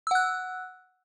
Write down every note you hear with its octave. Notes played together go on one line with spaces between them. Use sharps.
F#5 E6 F#6